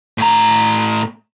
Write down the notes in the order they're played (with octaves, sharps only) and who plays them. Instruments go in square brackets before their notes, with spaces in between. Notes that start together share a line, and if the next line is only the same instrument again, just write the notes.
[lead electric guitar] A2 A#5